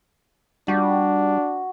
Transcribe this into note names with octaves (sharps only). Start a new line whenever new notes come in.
G3 D4 F#4